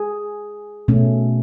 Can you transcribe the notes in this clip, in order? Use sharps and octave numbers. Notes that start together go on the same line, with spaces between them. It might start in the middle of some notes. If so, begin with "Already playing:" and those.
Already playing: G#4
B2 A3 C#4